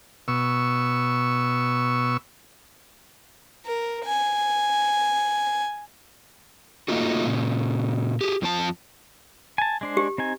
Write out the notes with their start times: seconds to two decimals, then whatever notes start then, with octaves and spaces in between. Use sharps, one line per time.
0.28 B2 C#6 E6
3.66 A#4
4.05 G#5
6.88 A3 A#3 D#4 F4 F#4
7.26 A#2 C#3
8.21 G4 G#4
8.42 F2 F3 C4 A5
9.58 G#5 A5
9.81 G#3 D4 C5
9.97 G4
10.18 C4 D#4 G#5